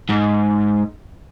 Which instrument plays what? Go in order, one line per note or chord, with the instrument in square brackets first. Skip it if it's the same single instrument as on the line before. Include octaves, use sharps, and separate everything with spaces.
[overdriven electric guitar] G#2